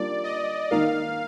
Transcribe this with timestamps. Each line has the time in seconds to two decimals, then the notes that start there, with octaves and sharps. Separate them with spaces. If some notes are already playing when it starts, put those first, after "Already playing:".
Already playing: G3 A#3 D4 F4 D5
0.24 D#5
0.71 D#3 A#3 D#4 A#4 F5